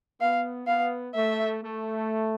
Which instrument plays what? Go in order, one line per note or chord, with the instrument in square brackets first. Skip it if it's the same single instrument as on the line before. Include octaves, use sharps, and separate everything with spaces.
[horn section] B3 [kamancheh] F5
[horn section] B3 [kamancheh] F5
[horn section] A3 [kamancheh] E5
[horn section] A3